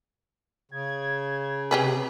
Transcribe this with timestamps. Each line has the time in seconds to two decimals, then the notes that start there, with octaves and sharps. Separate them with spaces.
0.71 C#3 G#6
1.71 C3 G4 G#4 B4